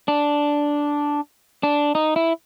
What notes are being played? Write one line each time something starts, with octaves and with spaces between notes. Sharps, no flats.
D4
D4
D#4
E4